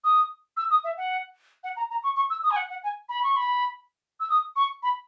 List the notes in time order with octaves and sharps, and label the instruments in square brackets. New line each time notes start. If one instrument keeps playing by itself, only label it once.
[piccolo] D#6
E6
D#6
E5
F#5
F#5
A#5
A#5
C#6
C#6
E6
D#6
G#5
F#5
F#5
G#5
B5
C#6
B5
E6
D#6
C#6
B5